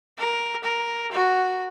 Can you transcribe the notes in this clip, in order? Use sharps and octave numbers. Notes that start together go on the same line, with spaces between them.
A#4
A#4
F#4